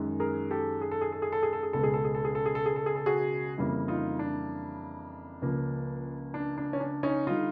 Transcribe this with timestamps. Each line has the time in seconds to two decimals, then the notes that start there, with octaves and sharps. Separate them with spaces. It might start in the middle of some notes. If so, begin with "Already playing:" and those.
Already playing: F#2 D#3 G#3
0.20 G#4 A#4
0.51 G4 A4
0.81 G#4
0.91 A4
1.01 G#4
1.12 A4
1.22 G#4
1.32 A4
1.43 G#4
1.53 A4
1.63 G#4
1.73 C#2 B2 G#3 A4
1.83 G#4
1.94 A4
2.04 G#4
2.15 A4
2.25 G#4
2.35 A4
2.46 G#4
2.55 A4
2.66 G#4
2.76 A4
2.86 G#4
2.96 A4
3.06 F#4 G#4
3.58 F2 C#3 E3 G3 A#3
3.88 D#4 F4
4.19 D4
5.42 C#2 C#3 F3 A#3
6.34 D4
6.58 D4
6.73 C#4
6.80 D4
7.03 C#4 D#4
7.27 D3 G3 D#4 F4